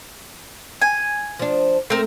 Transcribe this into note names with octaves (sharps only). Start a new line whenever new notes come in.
G#5
F3 D4
A3 C4 A#4